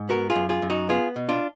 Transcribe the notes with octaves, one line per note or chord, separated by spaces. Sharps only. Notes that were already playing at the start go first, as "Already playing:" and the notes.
Already playing: G#2
B3 F#4 A#4
F4 G#4
F#2
F4 G#4
F#2
D#4 F#4
B3 F4 G#4
B2
D4 F4